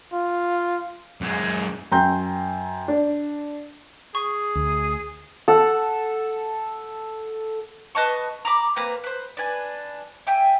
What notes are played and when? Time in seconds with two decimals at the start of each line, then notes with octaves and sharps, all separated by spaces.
0.13 F4
1.21 F#2 G#3
1.92 F#2 G5 A#5 C6 G6
2.88 D4
4.15 G#4 C#6
4.55 D2
5.48 A4 F#5
7.95 B4 D#5 A5 C#6
8.45 A#5 B5 D6
8.76 A#3 C4 B4 A#5
9.04 B4 C5
9.37 D4 B4 G#5
10.27 E5 G5 G#5